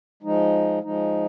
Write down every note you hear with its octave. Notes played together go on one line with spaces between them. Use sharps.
F3 G#3 D#4
F3 G#3 D#4